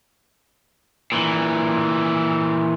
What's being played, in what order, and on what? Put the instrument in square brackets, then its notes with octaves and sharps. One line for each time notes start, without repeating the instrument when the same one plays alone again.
[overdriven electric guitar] A#2 E3